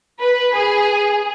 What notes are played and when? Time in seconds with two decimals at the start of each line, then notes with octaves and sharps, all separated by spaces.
0.20 B4
0.56 G#4